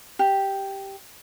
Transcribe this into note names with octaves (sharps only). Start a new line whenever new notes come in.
G4